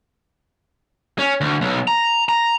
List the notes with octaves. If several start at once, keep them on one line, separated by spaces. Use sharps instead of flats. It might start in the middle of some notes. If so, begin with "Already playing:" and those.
C#4
D2
B1
A#5
A#5